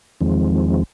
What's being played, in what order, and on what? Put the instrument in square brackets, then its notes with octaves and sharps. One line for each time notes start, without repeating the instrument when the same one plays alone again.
[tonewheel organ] E2 D#3 F3 G#3 C4